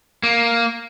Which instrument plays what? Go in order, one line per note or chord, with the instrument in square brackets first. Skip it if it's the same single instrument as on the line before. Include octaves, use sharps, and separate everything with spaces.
[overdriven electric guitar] A#3